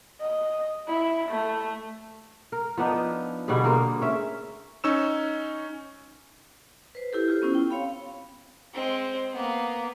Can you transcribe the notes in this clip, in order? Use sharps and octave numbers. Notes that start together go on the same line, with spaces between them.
D#5
E4
A3
A#4
F3 B3 D4 D#4
B2 D3 G3 G#4
A#3 G#4 A#4 C5
C#4 E5
C#4 D#4 C#6 E6 E7
B4 C5
E4 G4 A4
F4 G4 C5
B3 C#4 E4
G5
C4 C#5 F5 B5
G#3 C4
A#3 B3